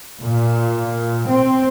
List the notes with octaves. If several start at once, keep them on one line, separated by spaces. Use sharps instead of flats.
A#2
C4